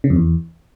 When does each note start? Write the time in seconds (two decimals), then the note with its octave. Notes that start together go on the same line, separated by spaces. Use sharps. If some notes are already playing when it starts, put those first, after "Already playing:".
0.04 C#3
0.10 F2
0.16 E2